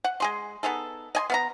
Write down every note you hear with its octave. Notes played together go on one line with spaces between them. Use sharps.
F#5
G#3 G#4 C6
B3 D#4 G#4 A4
D#5 G#5 C6
B3 F5 A#5